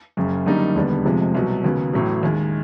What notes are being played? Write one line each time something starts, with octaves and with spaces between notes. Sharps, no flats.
F#1 F#2 C#3
F#2 D3 G3 A#3 D#4
E1 D#2 D3 G3 B3
F1 F2 C3 F3 G#3
C2 B2 F#3
D#2 C#3 F#3 B3
A1 A2 F#3
D#2 D#3 G#3